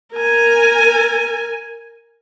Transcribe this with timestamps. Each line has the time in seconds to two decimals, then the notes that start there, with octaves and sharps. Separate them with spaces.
0.14 A#4 G#5